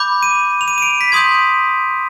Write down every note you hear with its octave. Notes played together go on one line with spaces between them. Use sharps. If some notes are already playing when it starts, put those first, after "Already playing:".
Already playing: B5 D6 G6
D#7
F7
D#7
D#7
D7
B6
C6 D#6 G6 G#6